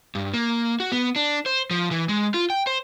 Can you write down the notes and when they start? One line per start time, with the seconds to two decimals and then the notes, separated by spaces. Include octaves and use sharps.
0.15 G2
0.34 A#3
0.80 F#4
0.92 B3
1.16 D4
1.46 C5
1.71 F3
1.91 E3
2.09 G#3
2.34 F4
2.50 G5
2.67 C5